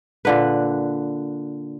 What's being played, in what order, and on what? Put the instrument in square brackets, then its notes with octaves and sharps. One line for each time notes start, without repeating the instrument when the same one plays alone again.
[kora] A#2 D3 B4